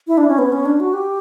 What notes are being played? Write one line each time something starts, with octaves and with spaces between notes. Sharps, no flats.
E4
D4
C#4
B3
C#4
D4
F#4
G4